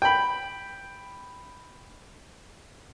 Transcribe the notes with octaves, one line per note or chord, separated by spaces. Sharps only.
G5 B5